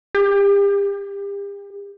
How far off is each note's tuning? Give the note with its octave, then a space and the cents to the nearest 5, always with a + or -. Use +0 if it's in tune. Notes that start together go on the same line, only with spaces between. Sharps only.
G4 +40